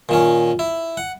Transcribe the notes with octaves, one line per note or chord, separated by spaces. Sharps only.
A#2 D#3 C#4
E4
F#5